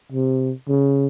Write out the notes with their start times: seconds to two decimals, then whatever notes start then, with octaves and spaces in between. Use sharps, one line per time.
0.12 C3
0.68 C#3